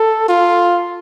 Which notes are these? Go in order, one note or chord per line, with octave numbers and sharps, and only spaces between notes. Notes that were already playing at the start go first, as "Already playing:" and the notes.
Already playing: A4
F4